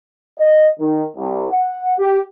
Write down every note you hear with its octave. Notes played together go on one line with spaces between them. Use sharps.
D#5
D#3
C2
F#5
G4